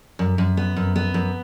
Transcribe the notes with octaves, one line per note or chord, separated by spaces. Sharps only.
F#2
F#2
B3
F#2
B3
F#2